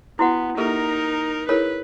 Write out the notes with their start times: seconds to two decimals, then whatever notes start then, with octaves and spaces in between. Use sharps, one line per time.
0.19 B3 E4 F#4 F#5
0.57 A#3 D#4 G4 A4 A#4
1.49 E4 G#4 A#4 B4 C#5